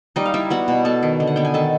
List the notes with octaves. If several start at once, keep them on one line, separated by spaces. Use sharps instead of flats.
G3 D#4 D#5
F5
G3 E4 E5
B3 F#4 F#5
B2
B3 A4 A5
D#3
D3
F#5
B3 G5
G#5
D#3 A4 A5